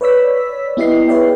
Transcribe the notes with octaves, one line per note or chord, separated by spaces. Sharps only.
B4 C#5 D5 E6 B6
B3 E4 G4 D#5 C7
G#4 B4 C#5 D5 E5 G5